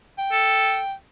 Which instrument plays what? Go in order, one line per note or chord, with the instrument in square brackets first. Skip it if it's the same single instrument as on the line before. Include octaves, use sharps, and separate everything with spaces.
[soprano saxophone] G5
[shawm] A4